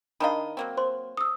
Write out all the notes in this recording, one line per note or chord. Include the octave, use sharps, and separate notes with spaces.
D#3 D4 D#5 F5 A#5 B5
F#3 A#3 C4
C5 C6
D#6 E6